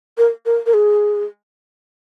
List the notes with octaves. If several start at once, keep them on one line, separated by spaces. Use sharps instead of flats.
A#4
A#4
A#4
G#4